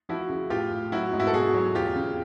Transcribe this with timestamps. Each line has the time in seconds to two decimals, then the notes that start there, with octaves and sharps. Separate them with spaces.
0.09 F3 E4 F#4
0.30 C#3
0.50 A2 F4 G4
0.72 A2
0.92 F#3 E4 F#4
1.13 G#2
1.19 E4 F#4
1.27 A4
1.33 B2 F#4 G#4
1.54 F#3
1.75 E2 F4 G4
1.96 C#3